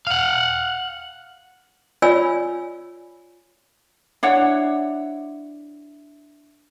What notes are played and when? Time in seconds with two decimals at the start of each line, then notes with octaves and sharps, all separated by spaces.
0.07 F5 F#5
2.02 F4 C#5 D5 G#5 B5 E6
4.23 D4 E4 C#5 F#5